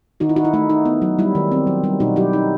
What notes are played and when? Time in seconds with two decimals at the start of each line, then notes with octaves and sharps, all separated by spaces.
0.20 D#3 D#4 F#4
0.29 E4
0.36 D#4 F#4
0.45 E4
0.54 A3 D#4
0.70 D#4
0.85 B3
1.02 F#3
1.19 G3 E4
1.35 D#3
1.52 C4
1.67 F#3
1.84 G3
2.00 B2 D#4 F#4
2.16 F#3 E4 G4
2.33 D#4